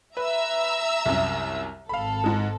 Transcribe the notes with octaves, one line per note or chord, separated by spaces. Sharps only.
B4 E5 A#5 E6
C2 F#2
G#1 A4 F5 B5
G#2 G#3